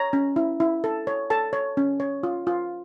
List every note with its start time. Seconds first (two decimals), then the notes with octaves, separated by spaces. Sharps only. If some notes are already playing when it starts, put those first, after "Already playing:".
Already playing: C#5 A#5
0.13 C#4
0.36 E4
0.60 E4
0.84 A4
1.07 C#5
1.30 A4 A5
1.53 C#5
1.77 C#4
2.00 C#5
2.23 F4
2.47 F4